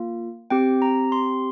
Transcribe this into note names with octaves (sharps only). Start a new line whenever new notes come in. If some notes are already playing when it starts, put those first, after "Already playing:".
Already playing: A#3 F4
C4 G4 G5
A#5
C6